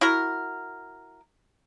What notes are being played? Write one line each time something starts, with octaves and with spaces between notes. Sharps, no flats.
E4 F#4 A#4